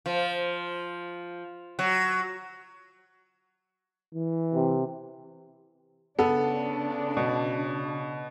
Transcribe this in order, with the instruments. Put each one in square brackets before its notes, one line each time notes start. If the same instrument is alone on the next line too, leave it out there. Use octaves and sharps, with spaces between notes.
[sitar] F3
F#3
[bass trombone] E3
[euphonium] C3
[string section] C#3 D4 [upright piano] B3 A4
[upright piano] B2